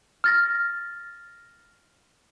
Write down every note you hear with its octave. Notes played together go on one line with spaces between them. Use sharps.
F6 A6 A#6